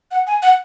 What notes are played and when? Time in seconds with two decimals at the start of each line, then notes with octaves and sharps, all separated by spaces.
0.11 F#5
0.27 G#5
0.42 F#5